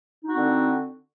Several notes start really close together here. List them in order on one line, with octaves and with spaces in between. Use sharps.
D#4 F#4 C4 D3